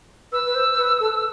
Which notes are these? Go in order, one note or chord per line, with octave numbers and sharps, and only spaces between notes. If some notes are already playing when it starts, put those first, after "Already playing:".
B4 E6
B4
C5
B4
A4